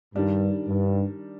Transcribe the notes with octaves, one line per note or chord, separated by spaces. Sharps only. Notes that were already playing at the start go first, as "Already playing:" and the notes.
G2 D#3 G3 D4
G2